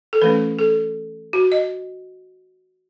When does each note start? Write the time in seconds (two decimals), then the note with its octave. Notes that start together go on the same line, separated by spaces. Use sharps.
0.13 A4
0.22 E3 A3 C#4 B4
0.59 A4
1.33 F#4
1.52 D#5